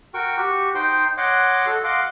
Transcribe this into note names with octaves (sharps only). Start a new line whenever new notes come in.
F#4 A#4 G5 C#6
F#4 G4 C#6
D#4 C5 G5 C6
C#5 D#5 F#5 C6 D6
F#4 A4
D#5 F5 F#5 C6 D6